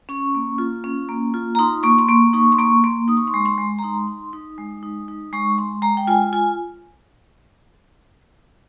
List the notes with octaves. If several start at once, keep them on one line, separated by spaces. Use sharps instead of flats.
C#4 C#6
A#3
F4
C#4
A#3
F4
A#5
D#4 C6
A#3 C#6
C6
A#3 C#6
D#4 C#6
C6
A#3 C#6
A#3 C6
D#4 D#6
C#6
C6
G#3 C#6
C6
G#3
A#5
D#4 C6
D#4
D#4
G#3
D#4
D#4
G#3 C#6
G#3 C6
G#3 A#5
G5
F4 G#5
F4 G#5